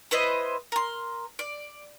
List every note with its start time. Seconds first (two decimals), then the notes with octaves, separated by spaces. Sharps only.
0.11 E4 B4 C5 D#5
0.72 A#4 C6
1.39 D5